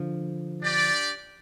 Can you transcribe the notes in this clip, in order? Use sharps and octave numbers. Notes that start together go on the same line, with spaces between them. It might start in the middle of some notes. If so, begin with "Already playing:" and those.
Already playing: D3 F3
D4 G4 D5